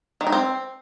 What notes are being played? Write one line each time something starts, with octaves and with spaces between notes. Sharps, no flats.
D#3
D#4
C4